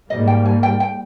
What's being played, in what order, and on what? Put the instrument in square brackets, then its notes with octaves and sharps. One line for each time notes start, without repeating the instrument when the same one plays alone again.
[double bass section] G#2 G3 A#3 [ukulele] D#5
[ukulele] G5
G#5
G5
G5